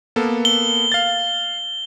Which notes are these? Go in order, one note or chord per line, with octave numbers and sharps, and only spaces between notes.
A#3 B3 A4
G7
F5 A6